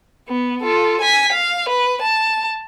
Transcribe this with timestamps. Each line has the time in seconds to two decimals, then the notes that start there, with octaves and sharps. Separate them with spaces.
0.28 B3
0.62 F4 A4
1.01 G#5 B6
1.32 F5
1.69 B4
2.02 A5